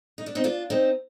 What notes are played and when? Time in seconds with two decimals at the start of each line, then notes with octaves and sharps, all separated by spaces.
0.18 D#4
0.26 D4
0.35 C4 D#4
0.44 D4 F4
0.70 C4 D#4